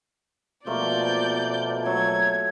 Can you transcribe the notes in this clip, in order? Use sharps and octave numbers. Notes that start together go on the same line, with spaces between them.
B2 F3 A3 A#3 C4 F4 D5 G6
F#3 A3 A4 G#6